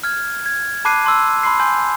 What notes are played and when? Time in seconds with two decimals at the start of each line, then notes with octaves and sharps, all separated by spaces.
0.04 F6 G#6
0.46 G#6
0.85 A5 B5 D6 F#6 C7 D#7
1.04 A5 C6 E6
1.43 B5 C6 C7
1.60 G#5 C6 G6